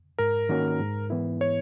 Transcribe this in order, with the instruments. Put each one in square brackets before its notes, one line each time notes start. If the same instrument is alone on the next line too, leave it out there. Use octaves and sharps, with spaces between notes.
[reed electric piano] G#2 [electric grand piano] A#4
[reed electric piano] D#3 A#3 C#4 F#4
G#2
E3 B3 E4
[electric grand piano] C#5